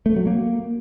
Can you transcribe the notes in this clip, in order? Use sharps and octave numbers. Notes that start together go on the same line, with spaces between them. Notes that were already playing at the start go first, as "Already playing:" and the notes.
A3
F#3
A#3